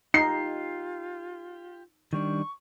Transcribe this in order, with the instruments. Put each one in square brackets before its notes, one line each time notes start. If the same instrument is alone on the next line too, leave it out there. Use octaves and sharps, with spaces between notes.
[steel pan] D#4 [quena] F4 [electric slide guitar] G4 [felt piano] C7
[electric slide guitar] D#3 G3 D4 [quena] C#6